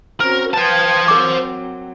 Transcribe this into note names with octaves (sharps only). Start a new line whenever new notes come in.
C4 C#4 F#4 A#4
B4 C5 G5 A5 G#6
F#3 C4 A#4 D6